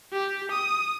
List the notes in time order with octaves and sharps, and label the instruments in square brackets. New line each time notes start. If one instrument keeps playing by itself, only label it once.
[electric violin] G4
D#6